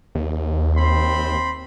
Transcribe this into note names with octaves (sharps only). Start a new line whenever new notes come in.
D#2
C4 B5 C6